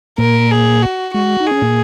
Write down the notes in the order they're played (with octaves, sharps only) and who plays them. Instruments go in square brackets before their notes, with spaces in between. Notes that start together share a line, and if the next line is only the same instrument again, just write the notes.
[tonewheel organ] A#2 A#3 [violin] A#4
[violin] G#4
F#4
[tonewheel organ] G#3 [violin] F#4
[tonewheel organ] D#4
[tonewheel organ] C#4 [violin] G#4
[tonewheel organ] A#2 A#3